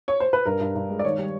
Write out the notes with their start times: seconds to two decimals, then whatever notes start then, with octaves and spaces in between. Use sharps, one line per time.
0.08 C#5
0.20 C5
0.33 B4
0.46 G2 A#4
0.60 G2
0.75 G2
0.90 G#3
0.99 D5
1.05 D#3 C#5
1.18 G3